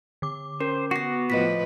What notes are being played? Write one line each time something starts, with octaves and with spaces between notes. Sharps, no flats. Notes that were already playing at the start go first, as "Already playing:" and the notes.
D3 D6
C#4 A#4 C5
B3 F#4 A#6 C7
A2 F3 B4 D#5 A#6 B6